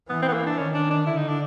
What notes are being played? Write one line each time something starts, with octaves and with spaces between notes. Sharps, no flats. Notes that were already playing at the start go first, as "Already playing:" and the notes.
E3 B3
C4
B3
A#3
D4
D#3 C#4
D4
D4
D3 E4
D#4
D4